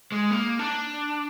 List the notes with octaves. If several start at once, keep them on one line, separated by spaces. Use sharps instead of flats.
G#3
A#3
D4